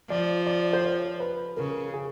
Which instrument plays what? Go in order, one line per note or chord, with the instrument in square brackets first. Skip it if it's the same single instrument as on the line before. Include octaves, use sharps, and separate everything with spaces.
[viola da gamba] F3 [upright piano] D5
[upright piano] D5
C5
C#5
B4
[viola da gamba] C#3 [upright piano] A#4
[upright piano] G#4